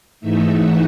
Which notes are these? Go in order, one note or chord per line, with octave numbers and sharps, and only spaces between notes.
G#2 E3 A3 D#4 E5
F#5